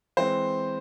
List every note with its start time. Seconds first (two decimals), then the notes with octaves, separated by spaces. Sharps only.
0.17 E3 G#3 C4 C5